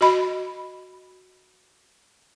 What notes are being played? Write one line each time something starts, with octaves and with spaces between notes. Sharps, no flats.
F#4 D#5 B5